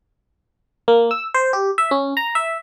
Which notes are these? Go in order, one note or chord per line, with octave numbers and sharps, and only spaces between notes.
A#3
E6
C5
G4
E5
C#4
A#5
E5